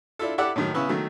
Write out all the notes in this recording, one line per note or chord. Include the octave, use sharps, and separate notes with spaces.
D4 E4 F4 A4
E4 G4 A4 D5 F#5 D6
A2 D#3 F#3
C#3 B3 C#4 E4 B4
D#3 F#3 A3